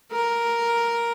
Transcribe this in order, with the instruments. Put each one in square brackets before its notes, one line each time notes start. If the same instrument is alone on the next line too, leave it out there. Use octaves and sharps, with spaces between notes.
[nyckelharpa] A#4